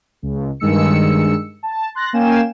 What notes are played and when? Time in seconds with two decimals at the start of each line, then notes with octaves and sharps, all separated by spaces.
0.22 C#2
0.60 G2 D#3 G#3 E6 C#7
1.63 A5
1.95 C6 F#6 A6 A#6
2.13 A#3 C#4 F5 G5 G#5 E7